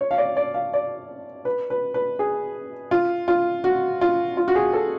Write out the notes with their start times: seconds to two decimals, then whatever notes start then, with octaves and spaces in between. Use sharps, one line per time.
0.01 C#5
0.11 F5
0.18 D5
0.37 D5
0.54 F5
0.74 D5
1.45 B4
1.70 B4
1.94 B4
2.19 G#4
2.91 F4
3.28 F4
3.64 F#4
4.01 F4
4.37 F4
4.48 F#4
4.55 G#4
4.73 A4